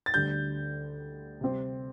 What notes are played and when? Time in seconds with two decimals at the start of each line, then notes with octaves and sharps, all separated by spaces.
0.06 A6
0.14 D2 D3 G3 G6
1.41 C3 G3 C4 G4 C5